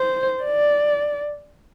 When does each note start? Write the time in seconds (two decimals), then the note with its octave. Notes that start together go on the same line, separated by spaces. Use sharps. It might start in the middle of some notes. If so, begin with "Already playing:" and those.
Already playing: C5
0.44 D5